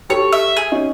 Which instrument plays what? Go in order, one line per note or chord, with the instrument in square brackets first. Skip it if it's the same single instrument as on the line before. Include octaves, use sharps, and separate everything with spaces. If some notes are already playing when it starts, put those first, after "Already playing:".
[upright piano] G4 A4 [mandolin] C#5
[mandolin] E5
G#4
[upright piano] C#4 D#4